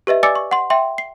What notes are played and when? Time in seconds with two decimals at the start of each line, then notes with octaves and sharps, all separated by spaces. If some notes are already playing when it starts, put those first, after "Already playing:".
0.07 G4 B4 D#5 E5
0.23 D5 G#5 D6 E6 A6 C#7
0.36 C#6
0.51 F#5 C6
0.70 E5 G5 C6
0.98 C7